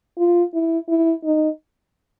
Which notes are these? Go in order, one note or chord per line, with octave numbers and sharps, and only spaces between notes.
F4
E4
E4
D#4